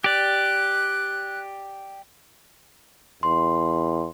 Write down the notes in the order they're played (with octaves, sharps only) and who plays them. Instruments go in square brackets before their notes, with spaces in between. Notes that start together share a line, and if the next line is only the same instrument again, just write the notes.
[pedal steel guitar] G4 D5 [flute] F#6
[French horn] E2 [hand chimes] C6